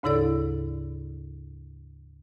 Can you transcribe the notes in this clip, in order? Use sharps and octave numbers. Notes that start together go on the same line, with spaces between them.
D2 G#2 C#3 E4 A4 D5